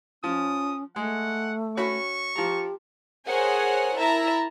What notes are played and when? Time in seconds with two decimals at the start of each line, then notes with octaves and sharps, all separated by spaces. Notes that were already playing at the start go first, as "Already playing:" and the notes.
0.24 F3 C#4 D#6
0.96 G#3 A3 F#5
1.77 C#4 F#4 B5 C#6
2.36 F3 G4 A#5
3.26 G#4 A#4 C5 C#5 F#5 G#5
3.99 E4 A#4 E5 A5 A#5